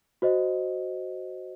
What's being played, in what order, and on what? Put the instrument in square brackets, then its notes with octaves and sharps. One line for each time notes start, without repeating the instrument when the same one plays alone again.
[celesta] F#4 C5 D#5